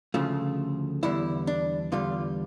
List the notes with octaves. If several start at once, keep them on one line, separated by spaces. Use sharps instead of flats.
D2 C#3 F3 A3 F4
E2 D3 G3 E4
D4
E2 D3 G3 F4